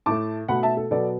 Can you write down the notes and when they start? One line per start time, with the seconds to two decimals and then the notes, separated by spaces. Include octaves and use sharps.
0.06 A2 A3 A5 D6
0.48 B2 A3 F#5 B5
0.63 E5 A5
0.77 A4
0.91 B2 F#3 B3 A4 D5